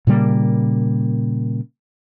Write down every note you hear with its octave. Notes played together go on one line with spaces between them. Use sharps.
A#2 C#3 G3 A#3